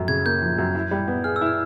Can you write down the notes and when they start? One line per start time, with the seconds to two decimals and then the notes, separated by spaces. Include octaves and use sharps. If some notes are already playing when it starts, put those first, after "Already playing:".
Already playing: F#2 F3 A3
0.08 C#3 G#6
0.26 A#3 G6
0.42 F3
0.58 F#2
0.75 E4
0.91 G3
1.08 B3
1.24 G#4 F6
1.36 E6
1.41 E4
1.46 F6